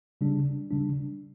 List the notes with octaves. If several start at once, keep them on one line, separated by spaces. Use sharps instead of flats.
C#3 G3 D4
C#3 G3 D4